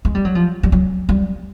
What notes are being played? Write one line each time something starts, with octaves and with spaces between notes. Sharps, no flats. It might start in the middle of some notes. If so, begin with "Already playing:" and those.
G#3
G3
F#3
F3
G3
F#3
G3